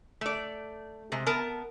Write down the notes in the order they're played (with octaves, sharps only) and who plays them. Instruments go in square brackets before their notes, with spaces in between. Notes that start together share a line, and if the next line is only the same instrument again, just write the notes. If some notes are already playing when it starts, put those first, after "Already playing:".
[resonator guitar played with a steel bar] A3 D5
C3 G#3
B3 A#4 A5